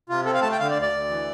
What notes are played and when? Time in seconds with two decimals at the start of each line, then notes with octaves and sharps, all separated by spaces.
0.09 C3 F4
0.26 C4 A4
0.34 F5
0.42 A3 A5
0.52 G5
0.59 D3 F5
0.70 D5
0.76 D2
0.82 D5
0.93 D2
1.09 E3